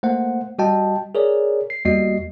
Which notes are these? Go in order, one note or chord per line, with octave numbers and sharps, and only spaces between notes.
A3 A#3 C5 F#5
G3 F#4 D#5 G5 A5
G#4 A#4 C#5 D5
C7
E2 G3 A#3 F#4 D#5 C7